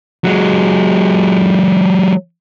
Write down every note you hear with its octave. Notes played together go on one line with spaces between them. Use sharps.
F#3 G#3